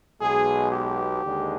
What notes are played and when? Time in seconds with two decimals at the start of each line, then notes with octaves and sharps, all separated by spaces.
0.21 B1 B2 G#3 G#4
0.72 G4
1.25 D#2 D3 G#3